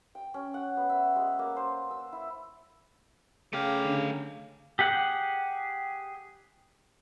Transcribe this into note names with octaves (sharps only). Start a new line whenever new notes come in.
G5
C#4
F#5
B3
E5
G#3
A#3
C5
E6
E4
C#3 A3 G4 F5
D3
G4 G#4 F#5